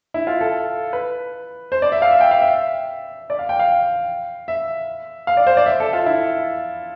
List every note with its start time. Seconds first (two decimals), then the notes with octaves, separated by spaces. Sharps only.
0.14 E4
0.27 F4
0.41 A4
0.93 B4
1.72 C5
1.82 D5
1.92 E5
2.02 F5
2.11 E5
2.21 G5
2.31 F5
2.41 E5
3.30 D5
3.39 F5
3.49 G5
3.59 F5
4.48 E5
5.27 F5
5.37 D5
5.47 C5
5.57 D5
5.66 E5
5.80 A4
5.93 F4
6.06 E4